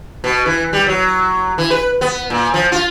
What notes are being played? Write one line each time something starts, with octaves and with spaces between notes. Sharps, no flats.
B2
E3
G3
F#3
E3
B4
B3
A#2
F3
F4